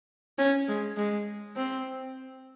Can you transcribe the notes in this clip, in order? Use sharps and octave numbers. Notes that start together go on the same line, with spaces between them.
C#4
G#3
G#3
C4